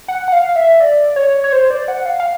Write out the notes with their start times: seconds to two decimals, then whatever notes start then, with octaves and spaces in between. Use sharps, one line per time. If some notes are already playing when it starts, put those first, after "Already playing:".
0.08 F#5
0.28 F#5
0.32 F5
0.56 E5
0.80 D5
1.16 C#5
1.44 C#5
1.52 C5
1.70 D5
1.88 F#5
2.06 F5
2.20 F5